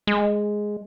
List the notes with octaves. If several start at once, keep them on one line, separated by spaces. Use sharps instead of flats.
G#3